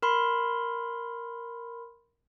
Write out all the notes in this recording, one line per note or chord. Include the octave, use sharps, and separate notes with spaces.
A#4 B5 C6